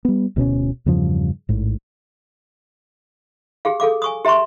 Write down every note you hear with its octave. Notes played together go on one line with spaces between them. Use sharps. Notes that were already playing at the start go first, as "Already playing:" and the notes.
G3 B3
D1 B2 C4 C#4
E2 G2 C#3 F3
A1 G#2
G4 G#4 F5
G#4 A4 F5 D6
G#5 C#6 D#6
G4 E5 A#5 C6 C#6